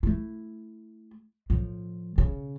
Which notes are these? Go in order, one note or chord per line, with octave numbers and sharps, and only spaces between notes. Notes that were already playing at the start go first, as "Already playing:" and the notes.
A3 E4
A2 F3
C#3